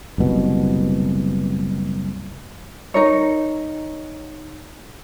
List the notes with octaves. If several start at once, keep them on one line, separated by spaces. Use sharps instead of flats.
F#1 C2 B2
D#4 A#4 C#5